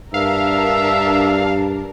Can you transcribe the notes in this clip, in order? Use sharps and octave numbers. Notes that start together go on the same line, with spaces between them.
G2 D4 A#4 E5 F5